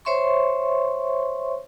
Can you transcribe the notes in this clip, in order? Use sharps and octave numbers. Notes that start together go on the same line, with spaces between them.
C5 C#5 E5 C6 C#6